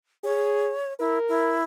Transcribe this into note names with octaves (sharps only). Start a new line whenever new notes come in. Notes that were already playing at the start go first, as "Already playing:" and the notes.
G#4 C#5
E4 A#4
E4